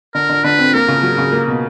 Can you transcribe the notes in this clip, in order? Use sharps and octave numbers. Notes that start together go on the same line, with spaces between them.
D3 A#4
D3
D3 B4
C4
A#3 A#4
C#3
F#3
C#3
A#3
B2